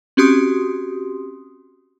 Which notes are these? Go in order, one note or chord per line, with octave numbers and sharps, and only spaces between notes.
C4 C#4 F#4 G4 C6 D#6